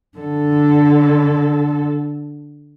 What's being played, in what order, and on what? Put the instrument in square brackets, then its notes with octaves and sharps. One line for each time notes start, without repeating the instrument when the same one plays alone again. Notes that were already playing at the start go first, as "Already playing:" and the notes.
[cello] D3 A4